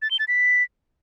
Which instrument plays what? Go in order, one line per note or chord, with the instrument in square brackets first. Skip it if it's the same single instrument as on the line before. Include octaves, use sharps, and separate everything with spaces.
[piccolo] A6
G7
A6
B6